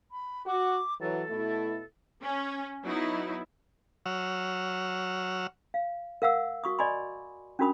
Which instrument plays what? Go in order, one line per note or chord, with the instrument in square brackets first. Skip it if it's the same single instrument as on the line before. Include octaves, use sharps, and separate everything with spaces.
[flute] B5
[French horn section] F#4 [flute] D6
[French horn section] E3 F#3 [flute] A4
[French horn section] B2 A3 E4
[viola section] C#4
F#3 B3 D#4 E4
[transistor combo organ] F#3 C#5 F#5 E6 F6
[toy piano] F5
A#4 F5 F#5 E6
F#4 C#6 D#6
D5 D#5 G#5 B5 C6
C#4 D4 F#4 A#4 B5 D#6